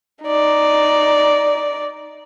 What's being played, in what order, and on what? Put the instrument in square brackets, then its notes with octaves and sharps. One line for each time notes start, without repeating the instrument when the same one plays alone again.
[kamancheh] D#4 D5